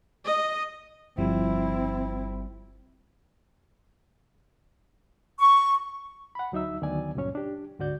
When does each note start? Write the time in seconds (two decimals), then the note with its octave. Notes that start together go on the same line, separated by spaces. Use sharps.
0.25 D#5
1.17 G1 F3 G3 C4 E4
5.39 C#6
6.35 F#5 B5
6.52 D2 F#3 D#4 E5 E6
6.81 D2 D#3 F#3 B3 D5 G#5
7.15 C#2 G2 A#2 F#3 C#4 C#5
7.35 D4 G4
7.79 D2 G#2 D3 F#4 D5 G6